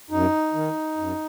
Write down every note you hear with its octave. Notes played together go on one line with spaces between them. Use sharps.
F#2 D#4
D#3
F#2